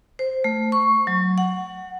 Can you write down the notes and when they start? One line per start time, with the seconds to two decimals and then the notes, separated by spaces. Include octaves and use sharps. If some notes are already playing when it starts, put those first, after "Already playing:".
0.19 C5
0.44 A3
0.72 C#6
1.07 F#3
1.38 F#5